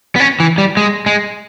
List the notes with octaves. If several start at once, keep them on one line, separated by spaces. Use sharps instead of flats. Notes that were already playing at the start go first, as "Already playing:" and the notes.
B3
C#4
E3
G3
G#3
G#3